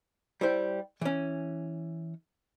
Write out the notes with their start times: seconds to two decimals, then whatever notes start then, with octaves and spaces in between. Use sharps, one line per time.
0.41 G3 E4 C5 G5
1.01 E3 C#4